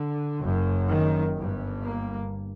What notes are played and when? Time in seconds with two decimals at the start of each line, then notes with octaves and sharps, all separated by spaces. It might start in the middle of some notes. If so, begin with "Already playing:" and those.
Already playing: D3
0.42 F#1 F#2
0.89 D#3
1.36 G1 G2
1.83 A#3